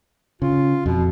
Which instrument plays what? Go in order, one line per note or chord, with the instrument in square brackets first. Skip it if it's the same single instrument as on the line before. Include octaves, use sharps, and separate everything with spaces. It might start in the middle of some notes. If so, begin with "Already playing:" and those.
[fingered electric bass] C#3 [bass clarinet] F4
[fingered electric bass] F2 [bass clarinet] B2